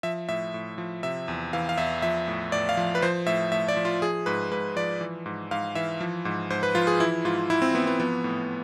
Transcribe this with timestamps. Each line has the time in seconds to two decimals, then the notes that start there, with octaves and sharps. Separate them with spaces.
0.03 F3 E5
0.29 A2 E5
0.54 A2
0.78 F3
1.03 C3 E5
1.28 E2
1.53 E3 F5
1.69 F5
1.78 E2 E5
2.02 F3 E5
2.28 A2
2.52 A2 D5
2.69 F5
2.77 F3
2.95 B4
3.02 F3 C5
3.27 A2 E5
3.52 A2 E5
3.68 D5
3.77 F3
3.85 F4
4.02 F3 G#4
4.26 G#2 B4
4.51 G#2 B4
4.76 F3 D5
5.01 E3
5.26 G#2
5.51 G#2 F5
5.75 E3 E5
6.01 F3
6.25 G#2
6.50 G#2 C5
6.63 B4
6.75 F3 F4
6.87 G#4
7.00 E3 E4
7.25 G#2 F4
7.50 G#2 E4
7.62 C4
7.75 E3 B3
7.87 B3
8.00 F3 B3
8.24 A2